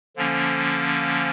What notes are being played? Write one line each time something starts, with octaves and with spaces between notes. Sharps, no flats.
D3 F3 A#3 C#4